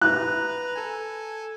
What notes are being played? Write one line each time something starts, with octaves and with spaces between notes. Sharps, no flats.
B4 A#5 F#6
A4 G#5